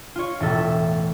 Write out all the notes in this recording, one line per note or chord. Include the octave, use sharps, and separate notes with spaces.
F4 C#5
E1 A2 A4 E5